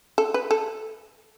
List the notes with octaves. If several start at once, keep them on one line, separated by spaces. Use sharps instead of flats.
A4
B4
A4